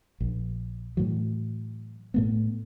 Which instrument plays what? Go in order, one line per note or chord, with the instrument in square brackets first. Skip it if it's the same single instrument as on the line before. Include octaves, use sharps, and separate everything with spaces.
[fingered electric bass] A#1
A2 E3 F#3
A2 A3 B3